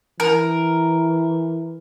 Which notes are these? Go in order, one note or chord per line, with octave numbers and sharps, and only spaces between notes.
E3 A#4